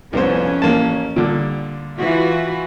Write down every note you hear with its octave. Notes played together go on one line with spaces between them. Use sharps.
C2 F2 B3 C#4 C5
A1 A#3 A5
A#2 D3 G3
E3 F4 F#4